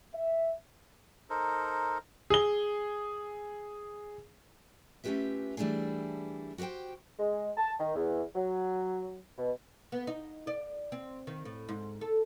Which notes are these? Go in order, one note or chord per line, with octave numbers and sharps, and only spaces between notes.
E5
D#4 A4 A#4 C5
G#4 G7
A3 C#4 F4 G4 B4 E5
E3 G3 A3 D4 E4 G#4
F#4 G4 A#4 C5 G5
G#3
A5
D#3
E2
F#3
B2
B3
D#4
D5
C4
D#3
A2
G#2
A4